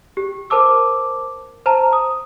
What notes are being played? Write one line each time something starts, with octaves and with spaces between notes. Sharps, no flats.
G4
A#4 C5 A5 D6 E6
C5 A5 A#5
D#6